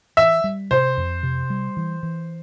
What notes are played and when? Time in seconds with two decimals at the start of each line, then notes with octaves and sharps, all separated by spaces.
0.17 E3 E5
0.44 G3
0.71 C3 C5
0.97 F2
1.23 C3
1.50 G3
1.77 E3
2.03 E3